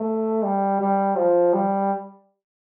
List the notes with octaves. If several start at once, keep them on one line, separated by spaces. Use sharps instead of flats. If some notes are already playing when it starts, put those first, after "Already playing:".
Already playing: A3
G3
G3
F3
G3